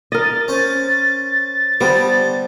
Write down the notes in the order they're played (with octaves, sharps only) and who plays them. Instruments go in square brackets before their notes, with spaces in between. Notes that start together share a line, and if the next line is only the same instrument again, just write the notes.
[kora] A#4 D#5 [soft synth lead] A6
[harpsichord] C#4 C5
[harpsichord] D3 C5 [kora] G3 B3